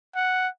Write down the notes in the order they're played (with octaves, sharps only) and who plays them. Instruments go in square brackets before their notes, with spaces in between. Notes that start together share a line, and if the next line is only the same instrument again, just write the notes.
[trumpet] F#5